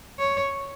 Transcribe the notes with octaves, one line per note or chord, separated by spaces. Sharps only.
C#5